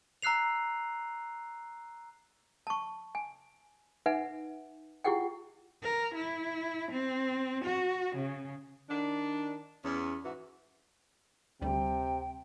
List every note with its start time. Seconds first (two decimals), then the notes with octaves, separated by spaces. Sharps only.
0.22 A#5 E6 F#6 C7 F7
2.67 A5 C#6
3.15 G#5
4.06 D#4 B4 E5 F#5 G#5
5.04 E4 F4 G4 G#4 F#5 G5
5.83 A#4
6.15 E4
6.92 C4
7.65 F#4
8.16 C#3
8.89 D#3 D4
9.84 E2 C#4
10.24 G#2 E3 F#4
11.62 D2 C3 G3 G5